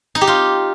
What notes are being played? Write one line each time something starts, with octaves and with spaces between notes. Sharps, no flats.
D#4
G4
F4